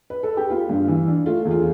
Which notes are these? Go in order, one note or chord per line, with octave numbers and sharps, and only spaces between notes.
B4
A4
G4
B3 F4
G2
E3
D4
A3 F4
E2
F4